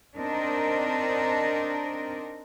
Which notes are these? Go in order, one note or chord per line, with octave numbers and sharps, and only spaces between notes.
C4 D4 D#4 A#4